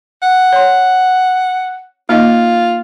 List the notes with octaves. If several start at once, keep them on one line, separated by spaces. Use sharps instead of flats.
F#5
C#5 C6
A#3 D#4 F4 D#5